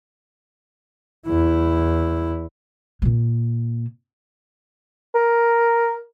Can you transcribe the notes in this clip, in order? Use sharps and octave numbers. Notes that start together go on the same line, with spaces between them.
E2 E4
A#2 A#3
A#4